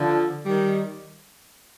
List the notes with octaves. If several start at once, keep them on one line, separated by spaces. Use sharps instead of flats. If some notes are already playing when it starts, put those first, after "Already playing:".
Already playing: D3 F3
D#3 G3